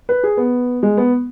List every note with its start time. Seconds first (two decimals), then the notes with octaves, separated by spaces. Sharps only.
0.09 B4
0.23 G#4
0.37 B3
0.83 G#3
0.97 B3